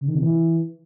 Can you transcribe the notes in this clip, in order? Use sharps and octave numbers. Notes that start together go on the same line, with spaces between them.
C#3
D#3
C3
E3